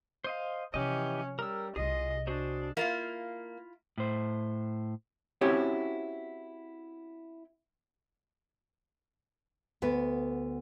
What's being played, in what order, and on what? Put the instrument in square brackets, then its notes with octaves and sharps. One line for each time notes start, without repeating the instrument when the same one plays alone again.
[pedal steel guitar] C5 D#5 F5
[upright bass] C3 F3 [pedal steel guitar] E3 G4 D#5 [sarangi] C#4
[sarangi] G3 [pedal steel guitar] A#4 E6
[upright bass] C2 C3 [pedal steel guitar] F4 G#4 [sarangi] D#5
[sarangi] D4 [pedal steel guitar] F#4 G#4 C5
[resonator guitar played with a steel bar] A#3 [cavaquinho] E4 F4 F5
[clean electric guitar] A2 C5
[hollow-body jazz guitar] C4 C#4 E4 F#4 G4 C#5
[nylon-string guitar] D2 B3 B4